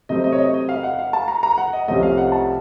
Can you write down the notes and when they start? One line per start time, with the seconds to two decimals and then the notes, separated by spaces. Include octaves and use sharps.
0.09 C3 F#3 A3 C4 D#5
0.24 D#5
0.32 C#5
0.39 D#5
0.54 D#5
0.69 F5
0.83 F#5
0.99 F5
1.13 A5
1.28 A#5
1.43 A#5
1.58 F#5
1.73 D#5
1.87 C2 C3 F3 A3 C#4 D#5
2.03 F5
2.18 F#5
2.32 A5